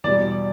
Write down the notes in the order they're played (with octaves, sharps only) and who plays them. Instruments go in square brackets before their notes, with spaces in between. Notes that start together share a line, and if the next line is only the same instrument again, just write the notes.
[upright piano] E2 B2 G3 [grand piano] D5